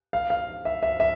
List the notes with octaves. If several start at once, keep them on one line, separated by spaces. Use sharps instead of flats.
F5
F5
E5
E5
E5